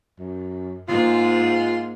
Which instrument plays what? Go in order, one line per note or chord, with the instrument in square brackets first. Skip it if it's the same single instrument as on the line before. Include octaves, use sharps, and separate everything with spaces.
[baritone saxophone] F#2
[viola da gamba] G#2 G#3 A#3 [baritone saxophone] F4